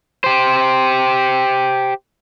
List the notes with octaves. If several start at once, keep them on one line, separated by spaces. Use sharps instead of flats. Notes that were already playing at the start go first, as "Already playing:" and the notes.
G4 C5